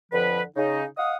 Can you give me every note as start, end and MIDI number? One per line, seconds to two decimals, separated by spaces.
0.12 0.41 41
0.12 0.41 50
0.12 0.41 53
0.12 0.41 71
0.57 0.85 49
0.57 0.85 63
0.97 1.16 75
0.97 1.16 77
0.97 1.16 78
0.97 1.16 87